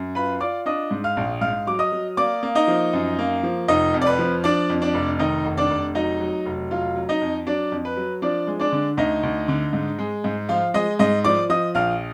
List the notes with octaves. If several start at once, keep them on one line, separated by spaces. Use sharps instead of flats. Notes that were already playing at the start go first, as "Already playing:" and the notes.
Already playing: F#2
F4 B4 B5
F4 D5 D6
D4 D#5 D#6
G#2
F5 F6
A#1
G#2 F5 F6
F#3 D6
D#5 D#6
F#3
A#3 D5 D6
A#3
D#4 D#5
F3
F#2
A#3
F3
F1 D#4 D#5
F2
D5
B4
F3
F3 D4 D5
F2
D4 D5
F1
D#3 D#4 D#5
F1
D4 D5
F1
F#3 D#4 D#5
F#3
F1
F#3 F4 F5
F#3
D#4 D#5
F2
F#3 D4 D5
F2
B4
F#3
F3 D4 D5
G#3
D4 D5
D3
D2 D#4 D#5
D2
D3
G#2
G#3
G#2
F3 F4 F5
G#3 D#5 D#6
G#2 D#5 D#6
F3 D5 D6
F3 D#5 D#6
A#1 F5 F6